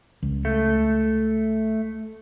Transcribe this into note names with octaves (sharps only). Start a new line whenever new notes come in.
C#2
A3